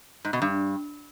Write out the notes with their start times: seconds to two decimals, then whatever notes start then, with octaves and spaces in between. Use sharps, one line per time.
0.25 G#2
0.33 B2
0.42 G2